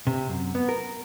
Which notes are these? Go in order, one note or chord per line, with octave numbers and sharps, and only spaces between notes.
C3
F#2
B3
A#4